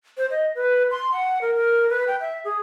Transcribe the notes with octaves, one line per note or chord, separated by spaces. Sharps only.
C5
D#5
B4
C6
F#5
A#4
A#4
B4
G5
E5
G#4